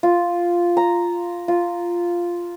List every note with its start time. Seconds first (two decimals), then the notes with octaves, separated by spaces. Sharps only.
0.03 F4
0.77 A#5
1.48 F4